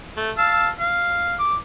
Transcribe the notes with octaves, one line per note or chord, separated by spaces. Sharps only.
A3
F5 A5 E6
F5
D6